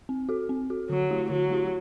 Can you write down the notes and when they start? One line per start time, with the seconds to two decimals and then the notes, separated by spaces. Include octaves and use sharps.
0.09 C4
0.29 F#4 A4
0.49 C4
0.70 F#4 A4
0.90 D3 F#3
1.10 A3 E4 G4
1.30 D3 F#3
1.50 A3 E4 G4